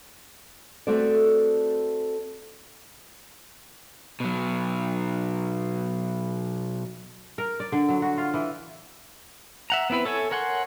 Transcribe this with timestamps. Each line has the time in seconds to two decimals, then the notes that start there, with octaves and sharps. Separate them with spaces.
0.87 A3 C4 F#4 A4 D5
4.20 B2 F#3
7.38 A#4
7.60 D5
7.72 D3
7.89 F#3
8.02 F#4
8.18 F4
8.34 E3
9.70 E5 F#5 A#5
9.90 B3 C4 E4 B4
10.05 A4 C#5 E5 G#5
10.31 A#4 C#5 F#5 G#5 C6